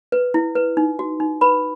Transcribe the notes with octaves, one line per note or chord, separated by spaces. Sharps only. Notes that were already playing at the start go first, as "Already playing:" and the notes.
B4
E4
B4
D#4
F#4
D#4
B4 B5